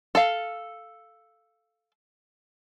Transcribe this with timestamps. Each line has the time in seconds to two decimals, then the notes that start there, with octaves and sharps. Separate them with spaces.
0.15 A4 F5